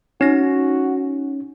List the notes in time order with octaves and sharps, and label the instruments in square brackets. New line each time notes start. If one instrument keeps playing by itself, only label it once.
[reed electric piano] C#4 [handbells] D#4 A#6 [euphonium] F#4